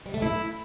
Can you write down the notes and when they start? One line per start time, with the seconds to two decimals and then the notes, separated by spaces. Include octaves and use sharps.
0.06 G3
0.14 A3
0.22 E4